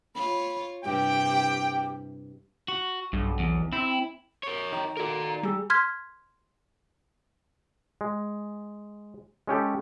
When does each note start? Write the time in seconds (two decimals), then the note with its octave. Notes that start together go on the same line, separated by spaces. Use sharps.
0.15 F4 C#5 B5
0.84 G2 C3 E4 G4 G5
2.68 F#4
3.13 B1 G2
3.39 E2
3.72 C4 E4
4.43 A#4 C#5 C#6
4.72 D#3 A#5
4.97 F#4 A4 A#4 D5
5.43 G3 G#4 G#5 E6
5.70 C6 F6 G#6 B6
8.01 G#3
9.47 G#3 C#4 G4 A4